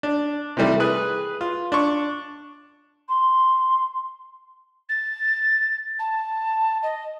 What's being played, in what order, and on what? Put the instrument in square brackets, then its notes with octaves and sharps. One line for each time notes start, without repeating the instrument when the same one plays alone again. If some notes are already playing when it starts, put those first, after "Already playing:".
[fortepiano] D4
C3 D#3 E3 G3 A3
G#4 B4
F4
D4 C#6
[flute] C6
[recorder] A6
A5
D#5